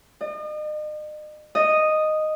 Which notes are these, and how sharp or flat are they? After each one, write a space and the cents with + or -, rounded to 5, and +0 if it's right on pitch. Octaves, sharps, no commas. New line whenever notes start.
D#5 -40
D#5 -5